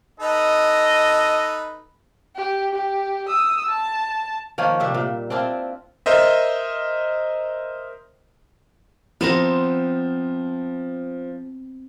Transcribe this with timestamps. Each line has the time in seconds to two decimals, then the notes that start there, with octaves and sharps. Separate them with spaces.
0.20 D#4 A4 B4 D#5
2.36 G4
2.75 G4
3.28 D#6 E6
3.69 A5
4.58 D#3 F3 A#3 C#5
4.80 C3 G3 E5
4.94 A#2
5.30 C4 D4 E4 F4
6.06 A#4 C5 D#5 E5
9.21 F3 B3 C4 A#5 E7